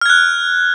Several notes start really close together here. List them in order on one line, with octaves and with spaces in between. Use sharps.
F6 G#6 F#6